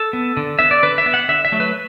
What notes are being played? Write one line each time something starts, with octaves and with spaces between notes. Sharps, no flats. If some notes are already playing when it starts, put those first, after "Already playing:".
Already playing: A4
B3
D3
B3 E5
D5
D3 B4
E5
B3
F#5
D3 E5
E5
F#3 A3
B4